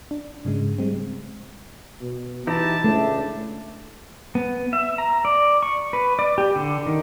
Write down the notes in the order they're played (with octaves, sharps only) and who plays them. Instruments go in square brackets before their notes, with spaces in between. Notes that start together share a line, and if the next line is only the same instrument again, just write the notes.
[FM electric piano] D4
G#2 C#3 G#3
G3 G#3 C4
[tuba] B2
[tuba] E3 [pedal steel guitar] D#4 E4 G4 [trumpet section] A5
[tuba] C#2 [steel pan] A3 [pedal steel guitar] D4
[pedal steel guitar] B3
E5
A#5
D5
C#6
B4
D5
G4
D3
D#3